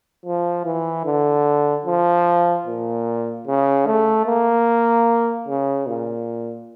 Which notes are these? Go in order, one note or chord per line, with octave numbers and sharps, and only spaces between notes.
F3
E3
D3
F3
A#2
C#3
A3
A#3
C#3
A#2